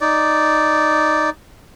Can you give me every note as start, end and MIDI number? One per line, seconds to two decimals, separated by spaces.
0.01 1.30 63
0.01 1.30 74